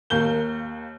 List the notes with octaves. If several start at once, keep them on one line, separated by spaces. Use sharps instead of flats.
D#2 A#3 G6 G7